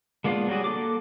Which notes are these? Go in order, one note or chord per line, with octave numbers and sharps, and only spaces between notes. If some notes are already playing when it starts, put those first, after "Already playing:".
G#3 A#3 B3 D4 F4
F#3 G3 F#4 G#4
A#3 A4 D6